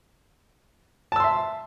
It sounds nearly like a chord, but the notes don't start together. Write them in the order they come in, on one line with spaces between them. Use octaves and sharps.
A5 E6 C6 E5